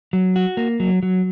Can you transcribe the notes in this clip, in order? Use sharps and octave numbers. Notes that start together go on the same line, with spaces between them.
F#3
F#4
A#3
F#3
F#3